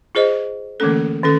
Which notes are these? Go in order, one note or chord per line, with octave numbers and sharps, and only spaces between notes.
F4 G#4 C5 D#5
D3 E3 A3 A#3 C#4 A4
D#3 C#4 A4